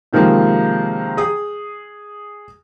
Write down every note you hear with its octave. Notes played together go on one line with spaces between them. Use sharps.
C3 D#3 F3 G#3 A#3
G#4 D#6